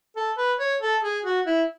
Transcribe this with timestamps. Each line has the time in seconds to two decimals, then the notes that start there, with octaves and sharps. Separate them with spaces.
0.16 A4
0.38 B4
0.59 C#5
0.81 A4
1.03 G#4
1.24 F#4
1.46 E4